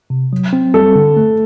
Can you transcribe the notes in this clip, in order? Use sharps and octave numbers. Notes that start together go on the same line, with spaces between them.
C3
F#3
C4
G3 A4
D3
A3